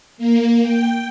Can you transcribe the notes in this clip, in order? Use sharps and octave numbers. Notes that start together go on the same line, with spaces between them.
A#3
G5